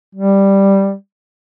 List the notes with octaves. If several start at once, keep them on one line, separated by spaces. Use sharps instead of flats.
G3